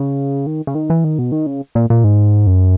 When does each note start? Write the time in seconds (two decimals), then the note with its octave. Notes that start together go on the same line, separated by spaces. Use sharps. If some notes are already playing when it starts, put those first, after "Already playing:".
Already playing: C#3
0.47 D#3
0.67 C#3
0.75 D#3
0.90 E3
1.04 D#3
1.19 B2
1.32 D#3
1.46 C#3
1.75 A#2
1.90 A#2
2.04 G#2
2.47 F#2